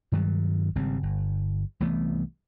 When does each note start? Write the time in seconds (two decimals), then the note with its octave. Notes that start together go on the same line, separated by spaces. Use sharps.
0.12 G2 D#3 F#3 G3
0.76 G#1 C#3 G3 C4
1.03 G1
1.80 C2 E3 A3 B3